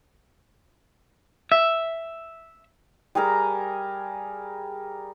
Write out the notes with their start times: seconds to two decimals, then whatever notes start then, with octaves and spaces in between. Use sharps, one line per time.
1.52 E5
3.15 G3 G#4 A#4 A#5